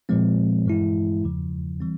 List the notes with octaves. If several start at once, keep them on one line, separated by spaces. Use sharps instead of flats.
A#2 F3 G#3 C4
G2 E3 G#3 E4
E2 C#3 F3
E3 G3 C4